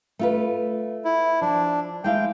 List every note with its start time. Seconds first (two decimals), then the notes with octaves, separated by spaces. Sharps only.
0.19 A3 F4 B4
1.05 E4
1.41 F3 D4
2.04 G#3 E4 F5 G5